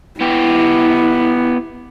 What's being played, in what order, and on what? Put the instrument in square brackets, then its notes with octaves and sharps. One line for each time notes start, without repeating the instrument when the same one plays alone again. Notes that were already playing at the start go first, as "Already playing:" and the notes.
[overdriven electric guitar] B3 G4 [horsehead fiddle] E4